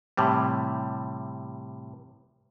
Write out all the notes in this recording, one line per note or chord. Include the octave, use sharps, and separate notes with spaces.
A2 C3 E3 G3